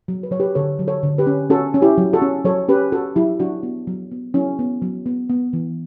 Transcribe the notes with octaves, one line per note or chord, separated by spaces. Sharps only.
F#3
B4
F#3 C#5
G4 B4
D3 A4 C#5
F#3
A4 C#5
D3
G4 B4
C#4
C#4 F#4 A4
C#4
E4 G4
F#3
F#4 A4
C#4
F#3 A4 C#5
C#4 G4 B4
C#4 F#4 A4
F#3 E4 G4
F#3 D4 F#4
B3
F#3
B3
F#3 C#4 E4
B3
F#3
B3
B3
E3